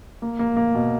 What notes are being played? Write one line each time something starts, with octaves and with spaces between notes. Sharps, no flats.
A#3
A#3
A#3
B2